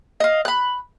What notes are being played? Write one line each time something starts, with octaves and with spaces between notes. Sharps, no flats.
D#5 F5
B5 F#6